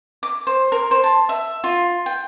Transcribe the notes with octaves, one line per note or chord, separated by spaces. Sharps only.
D6
C5
A#4
C5
A5
E5
F4
G5